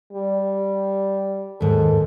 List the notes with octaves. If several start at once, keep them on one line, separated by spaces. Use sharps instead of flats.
G3
D#2 G#2 A4